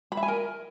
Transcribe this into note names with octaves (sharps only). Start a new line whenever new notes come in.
B5
E5
G#5
A#4